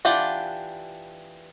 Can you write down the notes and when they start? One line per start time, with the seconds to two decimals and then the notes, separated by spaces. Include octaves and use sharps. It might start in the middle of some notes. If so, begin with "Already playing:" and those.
0.05 E3 D4 F4 G4 F#5